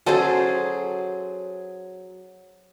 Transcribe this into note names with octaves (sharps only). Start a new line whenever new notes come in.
F#3 C#4 G#4 A4 C5